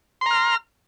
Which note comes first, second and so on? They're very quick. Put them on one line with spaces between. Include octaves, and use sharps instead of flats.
C6 A#5 F6